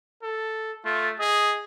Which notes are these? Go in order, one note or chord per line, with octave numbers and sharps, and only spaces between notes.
A4
A3 F4
G#4 D#5